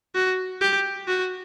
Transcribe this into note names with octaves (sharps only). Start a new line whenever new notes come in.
F#4
G4
F#4